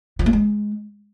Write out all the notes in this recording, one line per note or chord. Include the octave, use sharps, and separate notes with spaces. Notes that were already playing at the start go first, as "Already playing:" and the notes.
F3
A#3
G#3